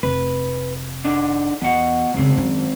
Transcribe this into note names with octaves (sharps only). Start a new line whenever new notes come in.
F1 B4
D#3 D4
E2 B2 F#5
F1 G#2 C#3 C4
F#2 D#3